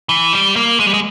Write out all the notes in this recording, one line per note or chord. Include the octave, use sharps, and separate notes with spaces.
E3
G3
A#3
G#3
G3
G#3